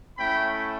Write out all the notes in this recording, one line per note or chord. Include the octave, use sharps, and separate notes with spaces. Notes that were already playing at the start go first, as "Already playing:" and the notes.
A3 C#4 E4 G5 B5